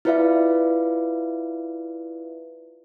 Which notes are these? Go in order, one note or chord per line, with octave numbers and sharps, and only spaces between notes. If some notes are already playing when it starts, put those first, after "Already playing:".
E4 F4 B4 D5 E5 F5